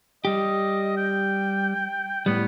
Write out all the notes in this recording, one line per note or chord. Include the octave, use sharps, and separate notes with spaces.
G3 G4 D#5
G5
A2 G3 B3